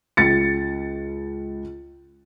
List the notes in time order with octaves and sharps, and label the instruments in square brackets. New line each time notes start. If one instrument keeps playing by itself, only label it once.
[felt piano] C#2 A6 C#7